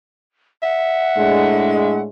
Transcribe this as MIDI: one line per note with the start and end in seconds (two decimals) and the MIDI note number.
0.63 2.01 76
0.63 2.01 78
1.17 2.09 45
1.17 2.09 56
1.17 2.09 62